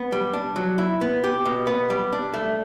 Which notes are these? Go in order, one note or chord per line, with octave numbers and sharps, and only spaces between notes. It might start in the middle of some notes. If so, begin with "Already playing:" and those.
Already playing: B3
G3
D4
F#3
E4
B3
G4
B2
B3
G3
D4
A3